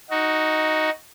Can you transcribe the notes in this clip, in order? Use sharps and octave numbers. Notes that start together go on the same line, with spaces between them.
D#4 F#4